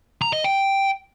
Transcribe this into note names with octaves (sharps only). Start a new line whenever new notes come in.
A#5
D#5
G5